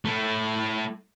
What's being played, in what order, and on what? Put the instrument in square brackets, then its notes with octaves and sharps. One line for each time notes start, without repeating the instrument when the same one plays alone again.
[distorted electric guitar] A3 E4